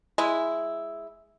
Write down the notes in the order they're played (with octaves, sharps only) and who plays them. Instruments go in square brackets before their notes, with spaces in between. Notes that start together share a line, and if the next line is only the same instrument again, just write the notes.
[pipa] G#3 E4